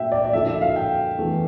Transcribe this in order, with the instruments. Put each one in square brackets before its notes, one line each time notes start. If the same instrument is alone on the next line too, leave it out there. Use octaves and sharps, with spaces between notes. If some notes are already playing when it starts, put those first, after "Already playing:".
Already playing: [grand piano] A#2 A3 D4 [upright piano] E5 G5
[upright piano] D5
D5
[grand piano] D3 F3 A#3 E4 A4 [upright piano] E5
[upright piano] E5
F5
G5
[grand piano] E2 E3 A3